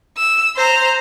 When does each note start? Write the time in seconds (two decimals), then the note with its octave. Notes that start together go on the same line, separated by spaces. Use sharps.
0.17 E6
0.56 C5 A#5